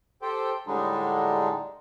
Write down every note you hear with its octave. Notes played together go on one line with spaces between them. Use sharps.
G4 A4 C5 G5
A2 D3 G3 G#3 D4 D#4